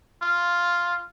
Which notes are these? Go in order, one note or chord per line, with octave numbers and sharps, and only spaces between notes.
F4